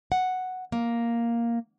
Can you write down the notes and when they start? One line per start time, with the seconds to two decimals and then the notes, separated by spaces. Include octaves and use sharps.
0.12 F#5
0.72 A#3